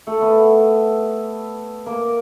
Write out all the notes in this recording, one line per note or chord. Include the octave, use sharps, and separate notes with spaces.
A3 A4
B3 B4
A#3 A#4